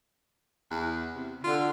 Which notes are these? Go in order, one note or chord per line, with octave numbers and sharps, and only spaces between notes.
E2
C3
D3 F4